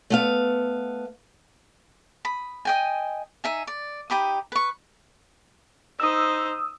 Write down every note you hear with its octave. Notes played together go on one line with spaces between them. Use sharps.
A3 B3 F5
B5 D#6
D#5 G5 G#5
D#4 E5 G#5
D5
D#4 G4 B5 D#6
B4 C#6
D#4 C5 D#6 E6